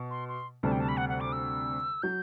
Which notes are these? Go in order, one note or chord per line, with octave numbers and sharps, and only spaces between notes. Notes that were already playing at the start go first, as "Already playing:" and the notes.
Already playing: B2
C6
C6
D2 C3 G3 A5
G5
A5
B5
F#5
F#5
D6
E6
F#3 G6